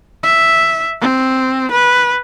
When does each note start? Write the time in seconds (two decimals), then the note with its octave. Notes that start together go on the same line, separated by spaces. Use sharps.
0.23 E5
1.01 C4
1.71 B4